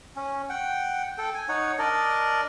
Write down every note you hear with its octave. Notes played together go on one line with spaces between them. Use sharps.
C#4
F#5 G5
A4 G5
G#5
D#4 C#5 F#5
D4 A#4 D5 D#5